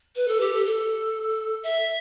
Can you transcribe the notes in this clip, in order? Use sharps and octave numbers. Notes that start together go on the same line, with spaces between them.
B4
A4
G4
A4
A4
E5